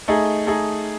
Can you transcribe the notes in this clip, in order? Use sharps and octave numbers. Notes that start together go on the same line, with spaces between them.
A3 D#4 G#4
A3 D#4 G#4